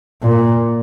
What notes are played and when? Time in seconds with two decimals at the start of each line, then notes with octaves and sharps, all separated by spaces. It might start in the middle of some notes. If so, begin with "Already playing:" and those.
0.22 A#2